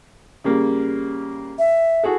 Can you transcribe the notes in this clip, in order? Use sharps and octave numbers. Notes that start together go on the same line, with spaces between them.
C#3 G3 A#3
E5
F#4 G#4 A4